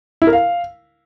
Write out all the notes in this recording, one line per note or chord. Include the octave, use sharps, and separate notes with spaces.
E4
A#4
F5